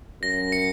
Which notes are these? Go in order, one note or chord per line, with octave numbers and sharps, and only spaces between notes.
F#2 A#6
C#7